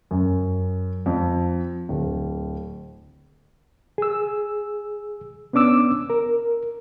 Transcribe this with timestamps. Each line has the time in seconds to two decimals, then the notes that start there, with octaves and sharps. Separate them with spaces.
0.11 F#2
1.06 F2
1.89 D1
3.98 G#4 E6
5.53 B3 C#4 D4 D6 E6
6.10 A#4